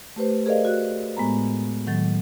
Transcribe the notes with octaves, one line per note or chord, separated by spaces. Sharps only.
A3 G4 B4 C5
G#4 A#4 C5 D5 D#5 F5
F#4 F#6
A2 G#3 B3 A#5
A2 D#3 F#3 A6